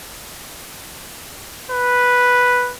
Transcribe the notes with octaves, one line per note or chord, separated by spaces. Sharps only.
B4